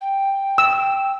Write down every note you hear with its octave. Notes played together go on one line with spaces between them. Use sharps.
G5
E6